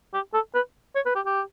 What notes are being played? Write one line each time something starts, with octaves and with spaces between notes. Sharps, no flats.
G4
A4
B4
C#5
B4
G4
G4